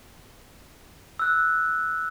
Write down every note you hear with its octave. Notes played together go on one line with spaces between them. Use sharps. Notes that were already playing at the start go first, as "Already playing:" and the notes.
E6 F#6